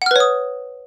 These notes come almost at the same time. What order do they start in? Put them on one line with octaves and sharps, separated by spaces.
F#5 F6 B4 C#5 D#6